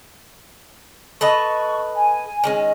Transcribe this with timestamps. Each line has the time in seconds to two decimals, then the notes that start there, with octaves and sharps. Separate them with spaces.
1.21 A4 B4 D#5 C#6
1.95 G#5
2.44 D#3 G#3 C#4